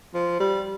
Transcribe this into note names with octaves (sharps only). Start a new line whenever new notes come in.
F3
G3